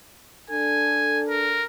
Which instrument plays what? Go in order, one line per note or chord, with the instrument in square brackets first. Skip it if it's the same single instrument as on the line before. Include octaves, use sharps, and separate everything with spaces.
[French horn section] D4 A4 [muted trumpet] G#5
[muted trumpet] A#4